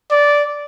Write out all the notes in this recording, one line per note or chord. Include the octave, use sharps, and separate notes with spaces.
D5